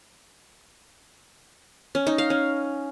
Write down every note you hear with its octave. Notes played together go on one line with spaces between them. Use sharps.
C#4
D#4
F5
C#4